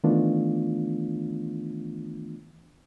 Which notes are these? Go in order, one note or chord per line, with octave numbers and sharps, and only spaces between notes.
D#3 E3 A3 B3 D4 F4